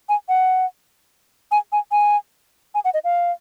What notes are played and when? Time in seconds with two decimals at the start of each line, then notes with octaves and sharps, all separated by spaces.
0.09 G#5
0.29 F#5
1.52 G#5
1.72 G#5
1.92 G#5
2.75 G#5
2.85 F#5
2.94 D#5
3.04 F5